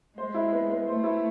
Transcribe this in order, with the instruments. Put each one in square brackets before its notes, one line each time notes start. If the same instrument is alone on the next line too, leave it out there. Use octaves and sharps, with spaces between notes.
[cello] G#3 [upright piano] C5
[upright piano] E4
B3
B3
[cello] A3 [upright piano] C5
[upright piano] E4